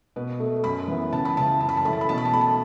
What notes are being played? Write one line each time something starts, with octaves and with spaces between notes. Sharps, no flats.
B2 B4
A3
F#2 B5
E3 B3
C#2 A5
B5
C#3 E3 A5
F#2 A5
B5
A5
E3 A3 B5
A5
B5
B2 A5
B5
A5
A3 B5
A5